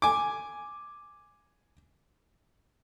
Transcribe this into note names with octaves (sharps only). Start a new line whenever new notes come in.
G#5 D6